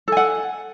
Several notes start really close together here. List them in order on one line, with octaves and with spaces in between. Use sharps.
A4 G#5 F#5